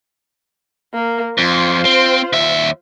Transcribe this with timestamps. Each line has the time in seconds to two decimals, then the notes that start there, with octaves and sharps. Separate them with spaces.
0.94 A#3
1.38 F2 F4 C5
1.85 C4
2.33 D#2 E5